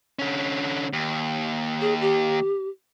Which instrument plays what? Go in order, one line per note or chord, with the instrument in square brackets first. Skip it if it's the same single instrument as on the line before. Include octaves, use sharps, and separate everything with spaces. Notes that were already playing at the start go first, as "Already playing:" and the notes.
[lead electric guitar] D3 C#4
D#2
[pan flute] G#4
G4